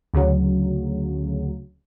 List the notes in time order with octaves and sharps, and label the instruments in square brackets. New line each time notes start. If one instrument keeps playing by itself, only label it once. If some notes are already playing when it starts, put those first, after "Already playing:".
[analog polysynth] D2 C#3 F#3